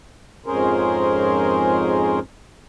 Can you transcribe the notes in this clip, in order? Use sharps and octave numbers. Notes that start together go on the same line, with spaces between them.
F2 G#2 C#4 G#4 A#4 C5